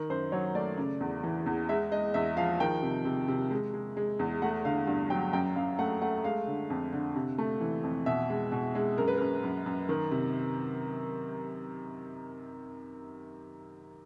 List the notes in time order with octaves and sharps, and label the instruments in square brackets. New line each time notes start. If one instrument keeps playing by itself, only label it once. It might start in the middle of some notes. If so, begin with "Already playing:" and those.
Already playing: [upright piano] D#3
F#2 C5
F#3 C#5
A3 D5
C#3
E2
E3
E2
G#3 E5
G#3 D#5
E2 E5
F3 F5
D#3 G5
C3
C3
C3
G#3
G#3
G#3
E2
A3 F#5
D3 F5
G2
F#3 G5
F#2 G5
F#2 F5
A3 F#5
A3 F#5
G#3 F5
D3
F2
D3
C3
A3
E3
F2
B2 E5
G#3
B2
G#3
F#2 A#4
B4
F#2 A#4
F#2
F#2
D#3
C3